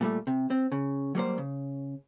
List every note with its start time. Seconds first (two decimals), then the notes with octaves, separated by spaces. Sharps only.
0.01 A#2 G3 A3
0.27 C3
0.50 C4
0.72 C#3
1.15 F#3 G3 A#3 C5
1.38 C#3